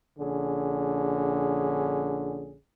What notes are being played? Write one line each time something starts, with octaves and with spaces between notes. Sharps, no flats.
A#1 D3 C#4 G#4